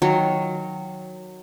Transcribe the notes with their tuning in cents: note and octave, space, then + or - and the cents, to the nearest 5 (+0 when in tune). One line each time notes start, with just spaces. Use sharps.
D#3 +0 F#3 -10